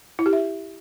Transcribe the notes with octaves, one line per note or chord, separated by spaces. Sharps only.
E4
G4
E5